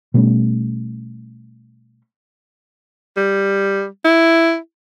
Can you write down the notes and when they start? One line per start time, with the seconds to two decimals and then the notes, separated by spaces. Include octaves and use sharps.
0.14 B2 G3 A3 C#4
3.17 G3
4.05 E4